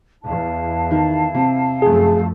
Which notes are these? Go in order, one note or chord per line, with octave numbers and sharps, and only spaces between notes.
E2 E4 F5 A5
D#3
C3
F#2 F3 A3 G#4